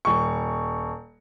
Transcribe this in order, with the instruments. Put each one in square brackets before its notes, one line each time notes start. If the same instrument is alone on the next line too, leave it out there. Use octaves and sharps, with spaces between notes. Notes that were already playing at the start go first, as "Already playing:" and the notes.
[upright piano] D#1 C#6